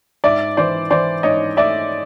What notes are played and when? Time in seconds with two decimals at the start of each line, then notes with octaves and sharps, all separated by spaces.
0.24 G#2 D5 E5
0.57 E3 C5 D5
0.90 E3 C5 D5
1.23 G#2 C#5 D#5
1.57 A3 D5 E5